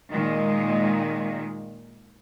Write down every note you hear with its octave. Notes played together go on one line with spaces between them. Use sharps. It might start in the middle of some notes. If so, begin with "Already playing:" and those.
A#2 D#3 G#3